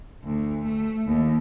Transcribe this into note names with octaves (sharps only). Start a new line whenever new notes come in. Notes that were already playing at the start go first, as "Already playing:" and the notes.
D2
A3
D#2